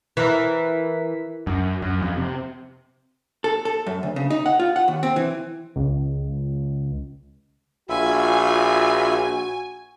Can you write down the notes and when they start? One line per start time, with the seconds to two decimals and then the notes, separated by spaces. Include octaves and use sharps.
0.17 E3 E4 A#4 B6
1.47 F#2
1.82 F#2
2.02 F2
2.17 C3
3.44 A4
3.65 A4
3.87 F#2
4.03 D2
4.16 C#3
4.30 D#4
4.46 F#5
4.59 F4
4.76 F#5
4.88 D#2
5.03 C4
5.16 E3
5.76 C#2
7.89 A#1 F4 F#4 E5 G#5 B5